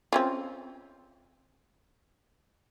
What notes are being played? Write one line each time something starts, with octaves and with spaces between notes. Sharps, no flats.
C4 C#4 F4